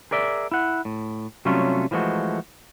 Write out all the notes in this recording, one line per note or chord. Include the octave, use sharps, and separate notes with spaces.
G#4 A#4 D5 E5
E4 F#5
A2
C3 F#3 G3 A3 C#4 F4
E3 F3 G#3 A3 F#4